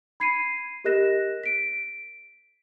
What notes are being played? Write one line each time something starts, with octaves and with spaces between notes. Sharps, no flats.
B5 G#6 C7 C#7 D#7
G4 A#4 D#5 F#6 A#6 E7
B6 D7